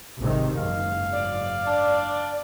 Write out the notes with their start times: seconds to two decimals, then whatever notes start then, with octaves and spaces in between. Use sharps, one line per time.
0.19 G#1 C3 D#3
0.57 F#1 G#2 F5
1.12 D5
1.67 D4